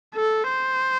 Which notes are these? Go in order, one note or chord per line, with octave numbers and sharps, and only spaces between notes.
A4
C5